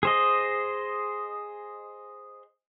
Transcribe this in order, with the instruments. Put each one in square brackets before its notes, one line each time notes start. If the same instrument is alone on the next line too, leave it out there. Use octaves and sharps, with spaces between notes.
[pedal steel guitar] G#4 C5 D#5